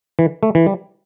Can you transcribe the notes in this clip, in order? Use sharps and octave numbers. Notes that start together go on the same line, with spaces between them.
E3
A3
E3
G3